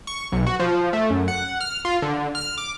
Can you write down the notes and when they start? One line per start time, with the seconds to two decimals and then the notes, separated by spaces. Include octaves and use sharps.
0.07 C#6
0.32 B1
0.46 F#4
0.60 F3
0.93 A3
1.10 F#2
1.28 F#5
1.60 F6
1.85 F4
2.02 D3
2.35 F6
2.58 D6